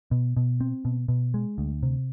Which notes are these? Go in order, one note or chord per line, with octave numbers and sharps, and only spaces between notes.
B2
B2
C4
B2
B2
G#3
D2
C3